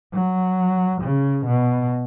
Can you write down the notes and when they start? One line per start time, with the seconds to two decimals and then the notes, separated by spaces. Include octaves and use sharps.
0.14 F#3
1.01 C#3
1.46 B2